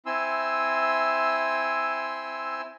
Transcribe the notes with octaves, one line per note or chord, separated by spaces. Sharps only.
C4 E4 G#5 C6 E6